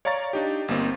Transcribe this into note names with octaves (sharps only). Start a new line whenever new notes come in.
C#5 D5 F5 A#5 C#6 A6
D4 D#4 G4
G1 A#3 C4 D#4